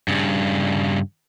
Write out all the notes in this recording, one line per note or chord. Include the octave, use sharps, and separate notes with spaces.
G2 C#3